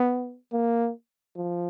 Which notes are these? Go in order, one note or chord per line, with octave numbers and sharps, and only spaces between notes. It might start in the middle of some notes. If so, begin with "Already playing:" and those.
Already playing: B3
A#3
F3